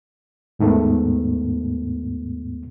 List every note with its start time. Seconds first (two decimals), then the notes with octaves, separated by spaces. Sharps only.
0.59 D#2 G#2 D#3 A3 B3